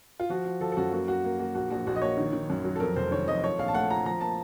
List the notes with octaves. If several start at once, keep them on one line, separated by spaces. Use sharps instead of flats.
F4
F3 F#4
F3
F3 A4
A4
F#2 F#4
A#3 F#4
A#3 F#4
A#3
A#3 F#4
A#1 F#4
A#1 F#4
A#1 F#4
D#5
A#3 C#5
D#3
D#3
F#2
F#3
A4
F2 A#4
F1 C5
D#3 C#5
F2 D#5
F3 C#5
A#1 F5
A5
A3 F#5
F3 A#5
F3 A#5
A#3 A5